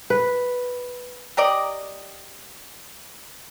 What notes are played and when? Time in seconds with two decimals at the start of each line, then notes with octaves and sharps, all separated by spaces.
0.10 B4
1.37 G4 A#4 D5 D#5